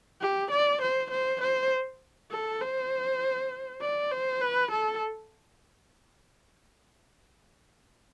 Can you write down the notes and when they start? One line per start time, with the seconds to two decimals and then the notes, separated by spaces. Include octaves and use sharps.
0.21 G4
0.51 D5
0.82 C5
1.11 C5
1.41 C5
2.31 A4
2.61 C5
3.81 D5
4.11 C5
4.41 B4
4.71 A4